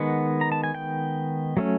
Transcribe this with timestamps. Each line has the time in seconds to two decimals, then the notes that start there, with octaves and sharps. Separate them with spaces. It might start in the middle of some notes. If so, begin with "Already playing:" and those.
Already playing: D#3 G#3 B3 F#5
0.41 A#5
0.52 A5
0.64 G#5
0.75 G5
1.57 F#3 A3 C#4